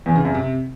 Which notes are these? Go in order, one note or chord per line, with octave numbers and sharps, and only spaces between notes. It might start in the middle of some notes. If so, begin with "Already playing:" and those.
E2
C#3
F#2
C3